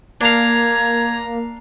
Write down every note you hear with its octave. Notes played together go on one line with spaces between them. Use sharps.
A#3 D4 F5 A#5 G#6